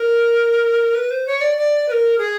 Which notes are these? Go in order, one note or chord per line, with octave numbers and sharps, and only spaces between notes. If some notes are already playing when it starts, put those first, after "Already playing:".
Already playing: A#4
B4
C5
C#5
D5
D5
B4
A#4
G#4